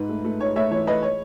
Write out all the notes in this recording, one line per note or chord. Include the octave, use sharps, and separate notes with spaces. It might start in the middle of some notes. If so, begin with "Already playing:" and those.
Already playing: G#2 D#4 B4
A3
A3
D#4 C#5
A3 C#5 E5
E3 C#5
A3 B4 D#5
C#5